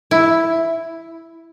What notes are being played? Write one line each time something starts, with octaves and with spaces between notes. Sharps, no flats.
E4